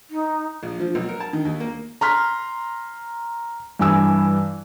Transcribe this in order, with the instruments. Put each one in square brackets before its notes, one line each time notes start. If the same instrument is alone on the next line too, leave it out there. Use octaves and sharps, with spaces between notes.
[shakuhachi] D#4
[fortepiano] A#1
F3
B1
A#4
A5
D#3
D#2
A#3
[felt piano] A#5 C6 F6 B6
G2 E3 G#5 E6